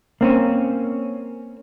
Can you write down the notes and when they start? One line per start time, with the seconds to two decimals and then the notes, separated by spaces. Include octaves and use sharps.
0.21 A#3 C4 C#4